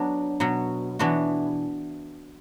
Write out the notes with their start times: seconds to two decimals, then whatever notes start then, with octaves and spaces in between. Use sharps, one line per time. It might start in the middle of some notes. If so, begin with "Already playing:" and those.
Already playing: F#3 B3 D4
0.40 B2 F#3 B3
0.99 E3 B3 D4 F#4